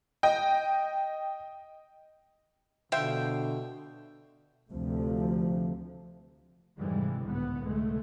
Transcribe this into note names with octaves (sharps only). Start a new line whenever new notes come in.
D#5 G5
B2 D3 F3 E5 G5 C6
D2 C3 F3 A3
F2 G#2 C3 E3 G3 G#3
G#1 C#2 A2 D3 B3
F1 C#2 D3 G#3 A3